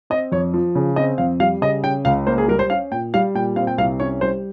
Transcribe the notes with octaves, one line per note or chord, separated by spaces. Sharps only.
C4 D#5
F2 C#5
F3
C#3
C4 D#5
F2 F5
G3 F5
C#3 D#5
C#4 G5
C#2 F5
A#3 C5
G#4
G3 A#4
C5
C#4 F5
A#2 G5
G3 F5
A#2 G5
C4 F5
G5
C2 F5
C#4 C#5
G3 C5